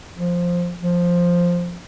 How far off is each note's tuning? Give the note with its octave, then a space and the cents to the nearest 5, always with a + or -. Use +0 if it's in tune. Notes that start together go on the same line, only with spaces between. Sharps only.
F3 +5
F3 +5